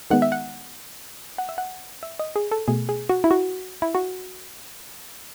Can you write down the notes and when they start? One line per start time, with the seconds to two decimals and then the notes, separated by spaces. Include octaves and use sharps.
0.10 D#3 G#3 B3 F#5
0.22 E5
0.32 F#5
1.38 F#5
1.49 E5
1.58 F#5
2.03 E5
2.19 D#5
2.36 G#4
2.51 A4
2.68 B2 A3 G#4
2.89 G#4
3.09 F#4
3.24 E4
3.31 F#4
3.82 E4
3.95 F#4